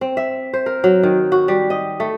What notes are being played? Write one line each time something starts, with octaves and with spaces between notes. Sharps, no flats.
C4
E5
C5
A#4
F#3
D#3
F#4
G3
D#5
A3